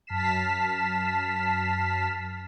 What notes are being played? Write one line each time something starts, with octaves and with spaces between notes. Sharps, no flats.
F#2 A5 F6 B6 C7 E7